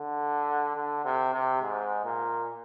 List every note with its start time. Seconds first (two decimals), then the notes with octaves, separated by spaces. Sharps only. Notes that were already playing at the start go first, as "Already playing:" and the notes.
Already playing: D3
0.76 D3
1.05 C3
1.34 C3
1.62 G#2
2.04 A#2